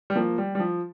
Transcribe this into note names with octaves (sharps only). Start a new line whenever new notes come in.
G3
F3 A#3
G3
G3
F3